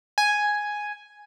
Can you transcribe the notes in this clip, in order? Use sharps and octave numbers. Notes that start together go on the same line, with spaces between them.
G#5